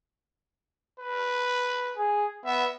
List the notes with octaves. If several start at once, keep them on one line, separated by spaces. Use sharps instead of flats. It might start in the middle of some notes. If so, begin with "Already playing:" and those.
B4
G#4
B3 E5